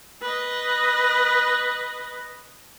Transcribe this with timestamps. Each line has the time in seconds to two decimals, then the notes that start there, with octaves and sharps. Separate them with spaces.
0.22 B4 D#5